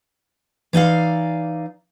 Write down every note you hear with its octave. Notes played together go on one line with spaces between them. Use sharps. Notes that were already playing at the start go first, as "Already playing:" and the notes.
E3 D#4 D5 F5